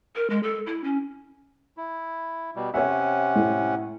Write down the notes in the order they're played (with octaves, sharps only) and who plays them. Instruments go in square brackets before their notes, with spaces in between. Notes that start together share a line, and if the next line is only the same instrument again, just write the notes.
[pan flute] A#4
G#3
A4
E4
C#4
[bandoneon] E4
B2 G3
[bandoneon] C3 C#4 F#5 [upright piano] C#5 E5
[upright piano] A2